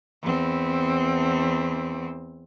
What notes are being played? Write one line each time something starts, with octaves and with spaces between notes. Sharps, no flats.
E2 C4